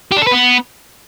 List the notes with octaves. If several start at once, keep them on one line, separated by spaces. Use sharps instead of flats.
G4
D4
A4
B4
B3